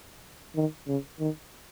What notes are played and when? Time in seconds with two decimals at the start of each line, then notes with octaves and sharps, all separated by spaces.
0.56 D#3
0.88 C#3
1.19 D#3